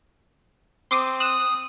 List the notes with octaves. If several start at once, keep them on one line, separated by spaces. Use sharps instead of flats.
C4 C6 D6 D#6
D#6 F#6 E7